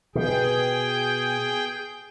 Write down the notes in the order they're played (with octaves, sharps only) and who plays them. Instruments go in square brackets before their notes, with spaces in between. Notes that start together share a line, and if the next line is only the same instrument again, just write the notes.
[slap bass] B2 [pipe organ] G#4 G5